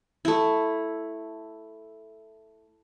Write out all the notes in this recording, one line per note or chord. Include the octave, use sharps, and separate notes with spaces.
A3 E4